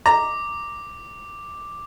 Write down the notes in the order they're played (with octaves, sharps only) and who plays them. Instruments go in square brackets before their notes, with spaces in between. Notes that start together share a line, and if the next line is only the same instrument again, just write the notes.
[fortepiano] A#5 [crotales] D6